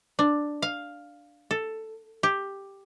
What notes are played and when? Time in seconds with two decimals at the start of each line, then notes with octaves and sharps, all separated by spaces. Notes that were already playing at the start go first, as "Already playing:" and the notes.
0.19 D4
0.62 F5
1.51 A4
2.23 G4